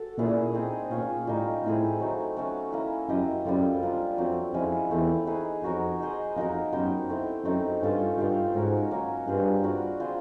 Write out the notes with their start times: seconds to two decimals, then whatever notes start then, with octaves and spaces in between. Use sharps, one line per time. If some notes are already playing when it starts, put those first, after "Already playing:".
Already playing: F#4 A4
0.18 A#2 A3 C#4 E4 G#4
0.54 C4 D#4 G#4
0.91 A#2 C#4 F4 G#4 C#5
1.27 A2 G3 A#3 D#4
1.63 A2 C4 E4 G#4
2.00 F#3 A3 C4 D#4
2.37 F#3 A3 C#4 F#4
2.72 A#3 C#4 E4
3.09 F#2 E4 G4 C5 D#5
3.45 F#2 G3 C4 F4 A4
3.82 G3 A#3 D4 F4
4.18 F2 F#3 A3 C4
4.54 F2 F3 G#3 C#4 E4
4.90 E2 A3 C4 E4
5.27 D#4 G#4 B4
5.63 F2 D#4 F#4 A#4 C#5
6.00 D#4 G#4 C5
6.36 F2 A#3 D#4 F#4 A#4
6.72 F#2 B3 D#4 G4 C5
7.09 A3 C4 E4
7.45 F#2 A3 C4 D#4
7.81 G2 C#4 F4 A4 C5
8.18 G2 D#4 G4 C5 F5
8.54 G#2 C#4 F#4 A#4 C#5
8.91 F#3 A#3 C#4
9.27 G2 C4 F4 G#4 C5
9.63 A#3 D4 F#4 B4
10.00 C4 F4 G#4 C5